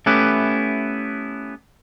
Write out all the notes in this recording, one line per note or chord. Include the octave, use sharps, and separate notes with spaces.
A3 B3 C#4 E4 G4 B4